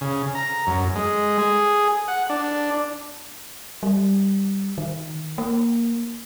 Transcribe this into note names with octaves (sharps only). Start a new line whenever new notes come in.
C#3
A#5
F#2
G#3
G#4
F#5
D4
G3
D#3
A#3